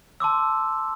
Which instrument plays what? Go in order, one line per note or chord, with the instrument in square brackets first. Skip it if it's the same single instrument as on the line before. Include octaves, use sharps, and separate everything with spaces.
[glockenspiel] A5 C6 D6 E6